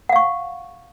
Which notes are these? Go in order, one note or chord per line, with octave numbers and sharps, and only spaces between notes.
F5 F#5 C#6